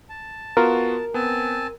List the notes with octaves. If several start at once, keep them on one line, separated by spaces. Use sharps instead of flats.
A5
B3 F4 F#4 A#4
B3 C4 G#5 A5